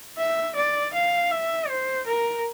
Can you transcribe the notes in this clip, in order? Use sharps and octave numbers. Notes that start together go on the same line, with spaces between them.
E5
D5
F5
E5
C5
A#4